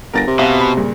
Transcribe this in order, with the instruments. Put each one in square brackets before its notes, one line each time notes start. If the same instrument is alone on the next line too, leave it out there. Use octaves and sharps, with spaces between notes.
[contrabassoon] G1 [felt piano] A#4 A6 A#6
[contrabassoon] C3
[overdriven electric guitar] B2 [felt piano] E5 F5
[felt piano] B5
G2 A#2 C#3